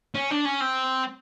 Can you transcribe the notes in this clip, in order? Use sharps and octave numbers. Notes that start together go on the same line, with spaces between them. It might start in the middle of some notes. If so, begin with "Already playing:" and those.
C#4
D4
C#4
C4